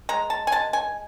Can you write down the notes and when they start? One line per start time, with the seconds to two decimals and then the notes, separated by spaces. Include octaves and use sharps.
0.09 G#3 A#5
0.30 A5
0.47 G#5
0.52 G#3 A5
0.73 G#5